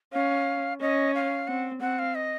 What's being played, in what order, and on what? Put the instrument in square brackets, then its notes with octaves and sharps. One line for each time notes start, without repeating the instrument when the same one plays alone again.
[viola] C#4 [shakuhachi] F5
[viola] C#4 [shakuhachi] D#5
[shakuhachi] F5
[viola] C4 [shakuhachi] F#5
[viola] C4 [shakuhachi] F#5
[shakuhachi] F5
D#5